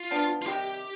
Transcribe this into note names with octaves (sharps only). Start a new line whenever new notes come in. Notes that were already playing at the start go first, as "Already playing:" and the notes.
Already playing: F4
F3 B3 D4
F4
C3 D#3 G3 G4